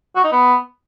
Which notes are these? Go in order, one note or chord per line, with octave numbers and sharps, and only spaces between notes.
F#4
D#4
B3